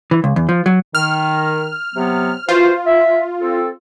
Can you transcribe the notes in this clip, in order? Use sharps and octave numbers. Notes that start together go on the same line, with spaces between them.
E3
C#2
E2
F3
F#3
D#3 F6
C3 F#3 B3
E3 F4 F#4 C5
E5
C4 A4